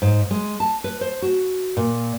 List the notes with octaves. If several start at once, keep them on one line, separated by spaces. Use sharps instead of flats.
G#2
G#3
A5
B4
C5
F#4
A#2